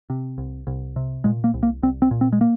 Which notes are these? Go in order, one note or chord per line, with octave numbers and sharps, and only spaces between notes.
C3
C2
C2
C3
A#2 G#3
A#3
C2
A#3
C2 C4
C4
A#2
C4
G#3
A#3